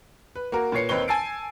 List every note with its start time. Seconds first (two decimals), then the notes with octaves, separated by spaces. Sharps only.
0.36 B4
0.52 A#3 F#4 A#4
0.72 A#2 B4 C#5 C7 C#7
0.89 D#2 C4 D#4 B4 C#5 G7
1.08 G#5 A5 E6 A6 C7 D7